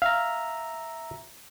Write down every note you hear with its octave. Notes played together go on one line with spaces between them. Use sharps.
E5 F5 A#5